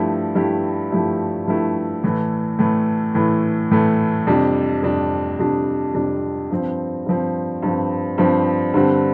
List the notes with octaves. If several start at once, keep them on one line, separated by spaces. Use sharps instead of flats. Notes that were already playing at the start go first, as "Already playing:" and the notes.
Already playing: G2 F3 A3 E4 G4
G2 F3 A3 E4 G4
G2 F3 A3 E4 G4
G2 F3 A3 E4 G4
A2 E3 A3
A2 E3 A3
A2 E3 A3
A2 E3 A3
F2 C3 G3 D4
F2 C3 G3 D4
F2 C3 G3 D4
F2 C3 G3 D4
G2 F3 C4
G2 F3 C4
G2 F3 C4
G2 F3 C4
G2 D3 G3 C4